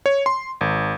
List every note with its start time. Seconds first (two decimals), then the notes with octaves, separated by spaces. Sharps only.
0.06 C#5
0.26 C6
0.61 G#1